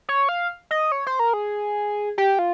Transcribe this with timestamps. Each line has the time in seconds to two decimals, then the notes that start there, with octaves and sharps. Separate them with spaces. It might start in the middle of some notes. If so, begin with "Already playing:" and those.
0.09 C#5
0.29 F5
0.71 D#5
0.92 C#5
1.07 C5
1.19 A#4
1.33 G#4
2.18 G4
2.39 F4